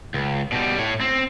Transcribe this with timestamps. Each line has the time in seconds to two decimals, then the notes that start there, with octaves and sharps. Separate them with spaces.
0.14 C#2
0.52 B2 G3
0.78 A2 C#5
1.01 C4